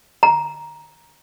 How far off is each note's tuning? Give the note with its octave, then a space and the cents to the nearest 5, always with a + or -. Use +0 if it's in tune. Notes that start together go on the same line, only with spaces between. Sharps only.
A#5 +10